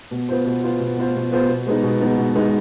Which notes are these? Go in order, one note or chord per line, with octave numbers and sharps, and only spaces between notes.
B2
B3 F4 C5
B2
B3 F4 C5
B2
B3 F4 C5
B2
B3 F4 C5
B2
G#3 B3 D#4
B2
G#3 B3 D#4
B2
G#3 B3 D#4